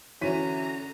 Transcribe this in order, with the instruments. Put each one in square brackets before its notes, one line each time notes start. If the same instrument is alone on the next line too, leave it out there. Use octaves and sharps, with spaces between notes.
[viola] D3 A#5 [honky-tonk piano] E3 [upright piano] C#4 B6 D#7 [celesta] F#4